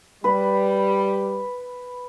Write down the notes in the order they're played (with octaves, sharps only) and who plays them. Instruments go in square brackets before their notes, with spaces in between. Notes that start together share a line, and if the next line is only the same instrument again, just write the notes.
[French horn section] G3 [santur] B4